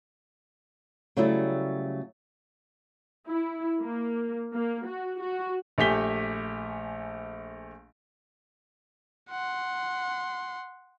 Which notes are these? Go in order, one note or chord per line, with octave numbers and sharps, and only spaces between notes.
C#3 F#3 G3 A3 E4 F#4
E4
A#3
A#3
F#4
F#4
A#1 A3 G4 G#5 B6 G7
F#5 C6